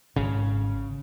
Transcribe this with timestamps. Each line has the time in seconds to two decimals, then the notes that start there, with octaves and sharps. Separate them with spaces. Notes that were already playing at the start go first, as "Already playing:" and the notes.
0.16 G#1 C#3